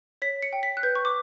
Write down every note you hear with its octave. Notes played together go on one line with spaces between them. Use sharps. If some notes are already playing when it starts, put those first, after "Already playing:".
C#5 B6
C#7
G5
B6
F#6
B4 G6
C#6
D6